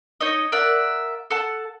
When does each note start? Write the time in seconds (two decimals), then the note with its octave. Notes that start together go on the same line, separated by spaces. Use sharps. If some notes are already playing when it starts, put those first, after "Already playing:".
0.21 D#4 C#5 D#5
0.52 A#4 D5 E5 F#5
1.30 A4 F#5 A5